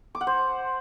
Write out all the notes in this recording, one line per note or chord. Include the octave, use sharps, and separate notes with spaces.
D6
F#5
C5